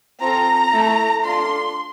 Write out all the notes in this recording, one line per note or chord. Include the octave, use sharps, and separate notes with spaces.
C4 F4 A4 A#5
A3 E4 A4
D4 F4 A4 C6